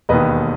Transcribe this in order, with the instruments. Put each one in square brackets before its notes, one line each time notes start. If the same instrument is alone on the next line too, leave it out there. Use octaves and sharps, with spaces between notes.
[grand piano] E1 D#2 D#3 B4 D#5